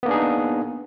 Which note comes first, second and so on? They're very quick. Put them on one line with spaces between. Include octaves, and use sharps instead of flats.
B3 A#3 D4 G#4 D#4